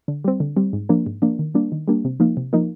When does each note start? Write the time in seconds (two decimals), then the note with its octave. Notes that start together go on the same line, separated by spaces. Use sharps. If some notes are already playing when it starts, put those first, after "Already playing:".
0.08 D3
0.24 G3 C4
0.40 D3
0.57 G3 C4
0.73 G#2
0.89 F3 A#3 D4
1.06 G#2
1.22 F3 A#3 D4
1.39 D#3
1.54 G3 A#3 D4
1.72 D#3
1.88 G3 A#3 D4
2.05 C3
2.20 F3 A#3 D#4
2.37 C3
2.53 F3 A#3 D#4